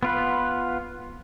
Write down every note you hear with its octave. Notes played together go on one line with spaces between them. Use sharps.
B3 F4 B4